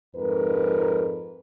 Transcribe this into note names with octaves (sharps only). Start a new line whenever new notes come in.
F2 G#2 A#4 B4